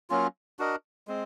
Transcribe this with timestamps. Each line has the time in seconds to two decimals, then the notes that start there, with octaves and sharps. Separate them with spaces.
0.10 F#3 A#3 C#4 F4
0.59 D4 F#4 A#4 D#5
1.07 G#3 C4